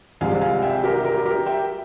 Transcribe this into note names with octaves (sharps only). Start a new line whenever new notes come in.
C2 C3 F3 G#3 F5 G#5
F5 G#5
E5 G5
G4 A#4
G4 A#4
G4 A#4
E5 G5